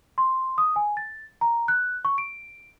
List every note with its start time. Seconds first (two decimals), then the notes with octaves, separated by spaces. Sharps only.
0.18 C6
0.58 D#6
0.76 G#5
0.97 A6
1.41 A#5
1.68 F#6
2.05 C#6
2.18 D7